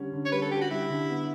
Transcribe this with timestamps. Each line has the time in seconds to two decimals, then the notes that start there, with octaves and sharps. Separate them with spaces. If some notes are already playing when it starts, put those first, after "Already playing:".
Already playing: D3 G3 C#4
0.13 D3
0.25 C#5
0.32 G3 B4
0.42 A4
0.51 G3 G4
0.61 F#4
0.70 G3 E4
0.90 D3
1.09 B3